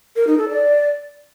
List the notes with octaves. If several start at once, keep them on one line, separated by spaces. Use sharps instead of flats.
A#4
D#4
A4
D5